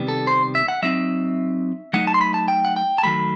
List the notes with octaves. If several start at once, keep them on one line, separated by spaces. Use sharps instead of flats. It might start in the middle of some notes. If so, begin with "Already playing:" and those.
Already playing: C3 D#3 G3 B3
A4
C5
E5
F#5
F#3 C4 D#4 E5
F#3 A3 D#4 F#5
A5
C6
B5
A5
G5
F#5
G5
A5
D#3 F#3 A3 B5